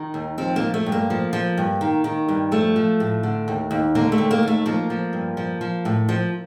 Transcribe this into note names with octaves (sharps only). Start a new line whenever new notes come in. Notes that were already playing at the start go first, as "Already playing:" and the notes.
Already playing: D#3
D#2
F3 C4
A#3
F3
A3
G2
A#3
F3
F3
G2
D#3
D#3
G2
F3 A3
F3
A2
D3
D#2
D#2
D3 A#3
A3
D#2
A#3
D#2 A3
F3 A#3
F3
G2
F3
F3
A2
F3